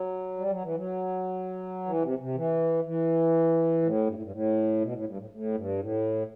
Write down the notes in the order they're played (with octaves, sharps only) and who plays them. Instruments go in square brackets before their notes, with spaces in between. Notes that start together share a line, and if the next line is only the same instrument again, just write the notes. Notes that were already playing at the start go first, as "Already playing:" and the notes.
Already playing: [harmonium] F#3
G3
F#3
E3
F#3
E3
C3
C3
E3
E3
A2
G2
A2
G2
A2
B2
A2
G2
A2
A2
G2
A2